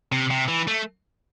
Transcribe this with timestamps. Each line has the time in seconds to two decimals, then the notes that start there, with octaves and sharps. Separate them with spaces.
0.12 C3
0.31 C3
0.48 E3
0.68 A3